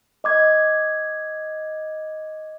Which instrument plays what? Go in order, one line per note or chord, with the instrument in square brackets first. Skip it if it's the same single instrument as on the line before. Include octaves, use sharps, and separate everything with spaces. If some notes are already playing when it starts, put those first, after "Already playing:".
[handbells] D#5 D6 G#6